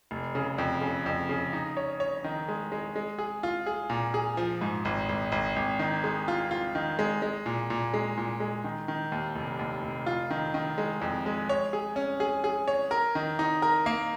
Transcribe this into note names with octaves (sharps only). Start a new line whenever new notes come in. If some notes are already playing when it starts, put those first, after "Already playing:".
F1
C#3
F2
C#3
F2
C#3
D#4
C#5
C#5
D#3
G#3
G#3
G#3
G#4
F4
G#4
A#2
G#4
F3
G#2
G#1
G#1
G#1
G#1
D#3
G#3
F4
F4
D#3
G#3
G#3
A#2
A#2
G#3
A#2
G#3
D#3
D#3
D#2
F1
D#2
F1
F4
D#3
D#3
G#3
F2
G#3
C#5
G#4
C#4
G#4
G#4
C#5
A#4
D#3
D#4
A#4
A#3